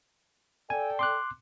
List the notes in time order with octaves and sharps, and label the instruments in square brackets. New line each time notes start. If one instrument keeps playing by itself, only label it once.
[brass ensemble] A4 D5 G5 [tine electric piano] G#5
[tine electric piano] C6 D6 F#6